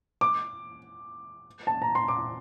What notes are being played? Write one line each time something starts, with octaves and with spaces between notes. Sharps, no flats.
D6
A5
A#5
C6
D6